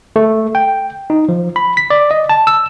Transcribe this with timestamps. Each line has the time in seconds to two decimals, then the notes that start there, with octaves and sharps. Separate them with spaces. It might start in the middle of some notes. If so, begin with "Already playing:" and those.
0.16 A3
0.55 G5
1.10 D#4
1.29 F3
1.56 B5
1.77 B6
1.90 D5
2.11 D#5
2.29 A5
2.47 E6